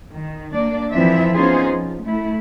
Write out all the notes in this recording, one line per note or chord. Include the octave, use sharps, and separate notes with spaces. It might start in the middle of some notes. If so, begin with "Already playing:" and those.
D#3
A#3 D4 D5
F2 E3 F3 C4 E5
B3 C#4 D#4 F4 G#4 C5
F3
A3 E4